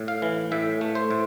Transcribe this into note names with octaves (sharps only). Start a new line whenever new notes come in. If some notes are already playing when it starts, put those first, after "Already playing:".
Already playing: A2
F5
E3
A2 E5
A3
C5
A2